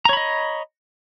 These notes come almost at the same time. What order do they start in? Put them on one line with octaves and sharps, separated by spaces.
A#5 C#5 B5 D#5